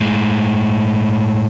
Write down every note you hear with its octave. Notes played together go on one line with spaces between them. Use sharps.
A2 G#3